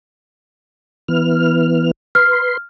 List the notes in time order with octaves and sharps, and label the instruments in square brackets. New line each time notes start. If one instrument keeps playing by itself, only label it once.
[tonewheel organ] E3 B3 F6
[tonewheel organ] B4 C6 [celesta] F6